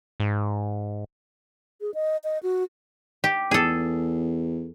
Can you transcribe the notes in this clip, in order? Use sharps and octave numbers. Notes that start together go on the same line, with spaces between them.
G#2
G#4
D#5
D#5
F#4
G4
E2 G#4 A4